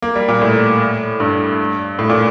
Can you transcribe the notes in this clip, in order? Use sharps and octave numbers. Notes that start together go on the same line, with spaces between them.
A#3
G3
A#2
A2
G2
A2
A#2